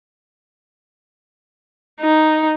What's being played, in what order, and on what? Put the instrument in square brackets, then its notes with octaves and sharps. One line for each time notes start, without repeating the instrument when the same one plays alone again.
[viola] D#4